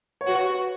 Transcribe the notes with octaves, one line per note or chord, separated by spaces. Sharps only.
C#5
F#4 B4